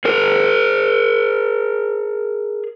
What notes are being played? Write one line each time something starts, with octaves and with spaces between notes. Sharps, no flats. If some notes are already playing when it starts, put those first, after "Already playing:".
G#4 A#4